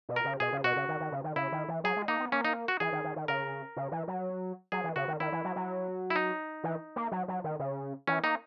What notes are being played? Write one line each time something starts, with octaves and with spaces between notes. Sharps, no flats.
B2
A#4
C#3
B2 G#4
C#3
B2 F#4
C#3
D#3
D#3
C#3
D#3
C#3 E4
D#3
E3
F#3 G#4
G#3
A#3 D#4
B3
A#3 C#4
D#4
F#4
E3 G#4
D#3
D#3
D#3
C#3 A#4
C#3
E3
F#3
F#3 G#4
E3
C#3 F#4
D#3
D#3 E4
E3
F#3
F#3
E4
D#4
E3
A#3
F#3
F#3
D#3
C#3
E3 C#4
A#3 D#4